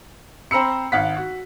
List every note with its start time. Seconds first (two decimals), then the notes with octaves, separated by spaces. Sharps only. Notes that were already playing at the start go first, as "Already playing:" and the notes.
0.51 C4 C5 A#5 B5 E6 C#7
0.92 G#1 F5 F#5 B6
1.17 F#4